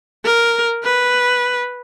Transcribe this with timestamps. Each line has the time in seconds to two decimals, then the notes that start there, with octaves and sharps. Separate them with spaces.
0.25 A#4
0.84 B4